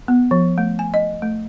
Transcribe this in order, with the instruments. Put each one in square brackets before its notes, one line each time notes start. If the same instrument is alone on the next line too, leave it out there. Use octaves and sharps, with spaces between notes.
[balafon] B3
F3
A3
G#5
D#5
A3